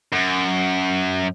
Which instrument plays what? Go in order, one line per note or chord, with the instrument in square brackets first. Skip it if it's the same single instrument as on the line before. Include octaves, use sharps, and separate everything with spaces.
[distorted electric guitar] F#2